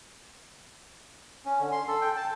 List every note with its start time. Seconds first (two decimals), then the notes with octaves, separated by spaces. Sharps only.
1.46 C#4
1.60 D3
1.72 C6
1.88 A4
2.01 G5
2.16 A5